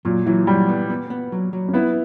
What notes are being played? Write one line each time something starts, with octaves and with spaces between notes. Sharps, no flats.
A#2 F#3
E3 F#3
F#3 G3
B3
B3
B3
F#3
F#3
C#4
B3 E4